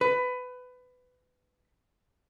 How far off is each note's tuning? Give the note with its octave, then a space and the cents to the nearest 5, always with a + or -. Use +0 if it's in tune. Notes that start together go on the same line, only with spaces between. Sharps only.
B4 +20